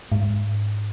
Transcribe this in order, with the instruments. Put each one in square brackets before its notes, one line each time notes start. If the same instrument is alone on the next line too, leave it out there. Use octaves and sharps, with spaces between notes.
[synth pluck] G#2